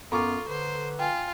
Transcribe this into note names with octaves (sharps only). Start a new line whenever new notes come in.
F#2 B3 F4 A4 A#5 C#6 D6
D3 B4 C5
F4 G5 G#5